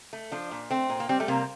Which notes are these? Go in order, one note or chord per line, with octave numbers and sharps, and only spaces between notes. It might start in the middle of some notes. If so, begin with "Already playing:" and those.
A3
F3 D4
A#2
A3 C4
A#2
A#3
G3 C4
A3
C3 A#3